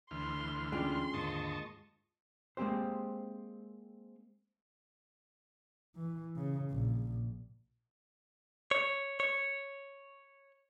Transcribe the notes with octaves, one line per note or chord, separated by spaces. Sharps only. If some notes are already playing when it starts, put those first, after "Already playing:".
D2 E3 C6 F6
G#3 C#4 D4 F4 D5 G5 C6
D#2 G#2 D3 D#5 A5 C#6
G#3 A#3 C4 G4 C5
E3
C#3
A#1
C#5
C#5